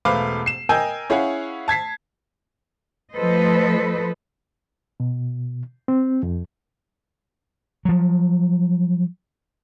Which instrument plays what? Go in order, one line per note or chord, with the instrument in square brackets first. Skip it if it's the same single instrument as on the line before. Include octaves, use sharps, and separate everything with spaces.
[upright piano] E1 A3 B4 C5 F5 D6
C7 E7
A#4 D#5 G5 G#5 E6 G6
C#4 E4 G#4 C#5 F5 F#5
A5 G#6 B6 C7
[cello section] F3 A3 A4 B4 C5 D#5
[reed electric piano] B2
C4
F2
[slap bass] F3 F#3